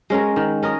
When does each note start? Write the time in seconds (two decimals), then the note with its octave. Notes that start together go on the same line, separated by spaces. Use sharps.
0.10 G#3 C#4 A#4
0.36 D#3
0.63 C#4 A#4 D#5